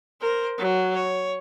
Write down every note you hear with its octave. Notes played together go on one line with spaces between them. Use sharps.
A#4 C5
F#3
C#5